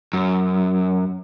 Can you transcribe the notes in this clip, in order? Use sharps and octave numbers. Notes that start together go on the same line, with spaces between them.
F#2